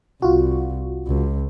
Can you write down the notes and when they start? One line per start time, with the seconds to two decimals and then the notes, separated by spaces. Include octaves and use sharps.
0.22 C2 F4 F#4
1.07 C#2